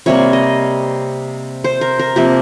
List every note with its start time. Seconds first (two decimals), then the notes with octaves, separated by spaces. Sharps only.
0.06 C3 G3 A#3 C#5
0.33 D#5
1.64 C5
1.81 A#4
1.99 A#4
2.16 C3 F3 A#3 G4